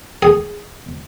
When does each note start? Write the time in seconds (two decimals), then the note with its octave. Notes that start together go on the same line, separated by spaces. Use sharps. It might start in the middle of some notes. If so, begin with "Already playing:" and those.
0.22 G#4